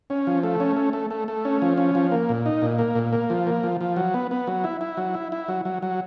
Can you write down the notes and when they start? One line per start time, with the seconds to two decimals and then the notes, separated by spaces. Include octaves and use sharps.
0.10 C#4
0.27 F3
0.43 A3
0.60 C#4
0.76 A3
0.93 A3
1.10 A3
1.28 A3
1.45 C#4
1.62 F3
1.78 C#4
1.95 F3
2.11 A#3
2.29 A#2
2.46 D#4
2.62 A#2
2.79 A#3
2.95 A#2
3.13 A#3
3.30 F3
3.47 A#3
3.63 F3
3.81 F3
3.96 F#3
4.14 B3
4.31 B3
4.47 F#3
4.64 E4
4.81 E4
4.97 F#3
5.14 E4
5.32 E4
5.48 F#3
5.65 F#3
5.82 F#3